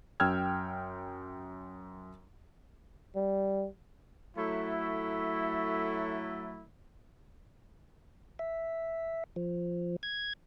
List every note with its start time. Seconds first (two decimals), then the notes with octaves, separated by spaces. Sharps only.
0.20 F#2 G5 E6 F6 G#6
3.15 G3
4.37 F#3 A3 E4
8.39 E5
9.36 F3
10.03 G#6